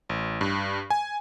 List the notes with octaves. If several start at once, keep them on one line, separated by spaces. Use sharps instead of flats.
A1
G2
G#5